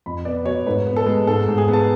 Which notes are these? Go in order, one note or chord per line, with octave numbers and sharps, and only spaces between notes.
F2 B5
B3 D5
F#3 C#5
G#2 B4
B3
A4
G#3
G#2 A4
G#2
G#4
B3
A5